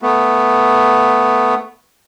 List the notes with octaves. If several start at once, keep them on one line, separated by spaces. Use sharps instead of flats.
A3 B3